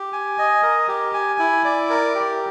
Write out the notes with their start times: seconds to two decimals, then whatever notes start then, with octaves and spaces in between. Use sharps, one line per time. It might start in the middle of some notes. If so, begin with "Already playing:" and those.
Already playing: G4
0.13 G#5
0.38 D#5
0.63 A#4
0.88 G4
1.14 G#5
1.39 E4
1.65 D5
1.90 A#4
2.15 G4